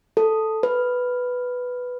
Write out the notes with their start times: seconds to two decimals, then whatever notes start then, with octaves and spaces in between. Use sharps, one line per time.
0.17 A4
0.63 B4